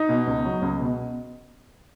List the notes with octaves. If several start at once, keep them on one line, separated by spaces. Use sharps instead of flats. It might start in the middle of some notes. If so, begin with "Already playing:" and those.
Already playing: D#4
B2
C#2
F#3
C#2
B2